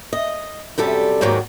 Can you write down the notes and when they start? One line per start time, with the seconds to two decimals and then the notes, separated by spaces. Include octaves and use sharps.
0.13 D#5
0.78 F#2 C3 G3 A4
1.21 D#2 G#2 D#3 F#3 A#3